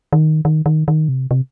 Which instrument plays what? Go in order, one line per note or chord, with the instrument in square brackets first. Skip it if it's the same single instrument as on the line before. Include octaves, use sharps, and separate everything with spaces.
[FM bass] D#3
D#3
D#3
D#3
C3
C3